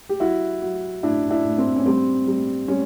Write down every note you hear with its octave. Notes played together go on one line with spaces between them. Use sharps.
G4
F#3 E4 F#4
F#3
A2 D4 E4
D4 E4
A2
C4
C#4
G3 C4
G3
G3 C#4